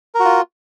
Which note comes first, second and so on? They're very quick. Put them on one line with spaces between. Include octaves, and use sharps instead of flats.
A#4 F#4 F4